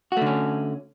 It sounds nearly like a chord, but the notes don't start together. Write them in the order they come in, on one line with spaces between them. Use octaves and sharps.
F#4 A3 D3 C#4